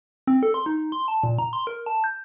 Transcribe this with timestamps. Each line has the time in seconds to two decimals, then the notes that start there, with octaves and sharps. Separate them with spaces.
0.27 C4
0.43 A4
0.54 C6
0.66 D#4
0.92 C6
1.08 A5
1.23 A#2
1.39 A#5
1.53 C6
1.67 A#4
1.86 A5
2.04 G6